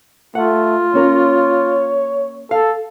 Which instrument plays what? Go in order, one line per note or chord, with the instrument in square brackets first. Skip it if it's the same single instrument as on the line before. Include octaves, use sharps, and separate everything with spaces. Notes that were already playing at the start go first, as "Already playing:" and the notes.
[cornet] A3 [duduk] F4 [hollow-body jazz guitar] F#5
[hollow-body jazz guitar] A#3 C#4 A#4 [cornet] C#5
[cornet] A4 [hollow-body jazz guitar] F5